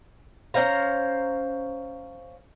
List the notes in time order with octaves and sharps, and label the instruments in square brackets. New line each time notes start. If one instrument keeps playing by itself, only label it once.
[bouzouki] C#4 C5 F5 A#5